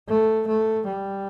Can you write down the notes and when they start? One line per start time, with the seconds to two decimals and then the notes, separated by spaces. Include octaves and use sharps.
0.08 A3
0.48 A3
0.87 G3